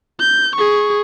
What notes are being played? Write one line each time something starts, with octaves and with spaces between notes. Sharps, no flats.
G6
G#4 C#6